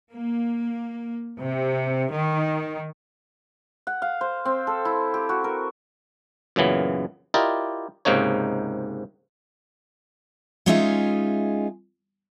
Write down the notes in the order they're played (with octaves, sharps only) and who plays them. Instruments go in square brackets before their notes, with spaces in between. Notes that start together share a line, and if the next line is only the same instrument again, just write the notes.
[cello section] A#3
C3
D#3
[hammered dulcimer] F#5
F5
C5
C4
A4
E4
G4
F#4
A#4
[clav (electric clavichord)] F#2 A#2 C#3 E3 B3
E4 F4 G4 A#4 D5 D#5
C#2 G#2 C3 A#3 D#4 C#5
[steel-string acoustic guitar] G#3 C#4 D#4 F4 G#4 E5